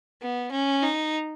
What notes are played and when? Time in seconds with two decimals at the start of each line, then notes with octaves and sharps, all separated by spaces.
0.21 B3
0.51 C#4
0.83 D#4